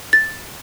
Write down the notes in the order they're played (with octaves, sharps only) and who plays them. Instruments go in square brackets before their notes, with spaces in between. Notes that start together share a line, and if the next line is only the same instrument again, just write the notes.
[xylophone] A6